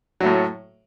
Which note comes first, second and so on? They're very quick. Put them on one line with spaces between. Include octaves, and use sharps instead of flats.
F#3 A3 A2